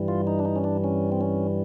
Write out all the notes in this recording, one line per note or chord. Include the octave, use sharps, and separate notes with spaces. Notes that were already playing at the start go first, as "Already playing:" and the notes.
Already playing: G2 E3 G3
F4
D#4
D4
D#4
C#4
D4
C#4
C4
C#4